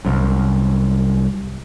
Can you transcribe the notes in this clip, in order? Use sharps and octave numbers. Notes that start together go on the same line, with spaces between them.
C2 F#2